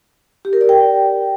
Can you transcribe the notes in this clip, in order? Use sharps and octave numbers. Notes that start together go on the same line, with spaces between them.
G4
A#4
D5
G5